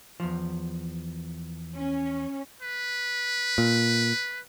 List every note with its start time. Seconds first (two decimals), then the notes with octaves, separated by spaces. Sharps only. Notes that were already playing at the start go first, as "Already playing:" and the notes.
0.20 E2 F3
1.76 C#4
2.61 B4
3.58 A#2